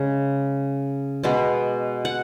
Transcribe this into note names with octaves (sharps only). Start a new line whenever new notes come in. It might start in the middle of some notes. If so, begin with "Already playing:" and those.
Already playing: C#3 G#3
B2 G#3 B3
F#5